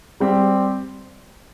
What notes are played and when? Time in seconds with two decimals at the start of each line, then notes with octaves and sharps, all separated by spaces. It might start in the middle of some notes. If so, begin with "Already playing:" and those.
0.20 G3 C4 G4